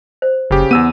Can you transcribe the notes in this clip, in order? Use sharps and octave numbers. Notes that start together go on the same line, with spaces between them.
C5
F#1 C#3 G4
E2 B3 E6 D#7